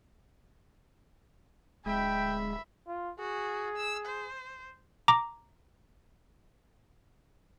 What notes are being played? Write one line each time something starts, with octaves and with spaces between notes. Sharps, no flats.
D1 G#3 E5 G5 B5
F4
F#4 G#4
E6
C5
A#5 D6